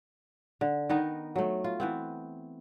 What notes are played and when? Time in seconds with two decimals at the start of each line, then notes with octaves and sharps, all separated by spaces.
0.61 D3
0.89 D#3 B3 D#4
1.36 F#3 A3
1.64 F4
1.80 E3 B3 C4